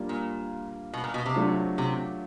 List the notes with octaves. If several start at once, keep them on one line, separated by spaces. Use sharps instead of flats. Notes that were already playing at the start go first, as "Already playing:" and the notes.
Already playing: G3 A#3 D4 F4
A#2
B2
A#2
B2
C3
F#3 A3 D4 F4
C3